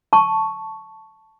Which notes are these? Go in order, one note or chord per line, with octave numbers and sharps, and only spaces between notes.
A5 C#6